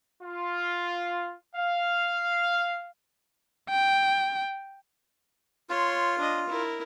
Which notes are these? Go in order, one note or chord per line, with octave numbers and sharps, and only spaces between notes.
F4
F5
G5
F4 C#5 C6
D4 D#5
E4 A#4